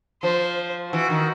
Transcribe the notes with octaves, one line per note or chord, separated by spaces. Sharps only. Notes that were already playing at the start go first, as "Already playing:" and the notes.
F3 C5
E3 F#4
D#3